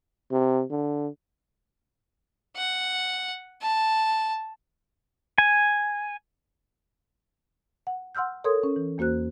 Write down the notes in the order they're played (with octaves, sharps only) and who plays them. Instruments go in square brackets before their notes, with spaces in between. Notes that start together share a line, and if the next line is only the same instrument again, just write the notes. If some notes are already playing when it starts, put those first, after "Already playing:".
[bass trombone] C3
D3
[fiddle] F#5
A5
[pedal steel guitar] G#5
[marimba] F#5
F#5 C6 E6 F6 G6
A4 A#4 C#5 C6 D#6 G#6
C#4
E3
E2 A#3 F#4 C5 F#6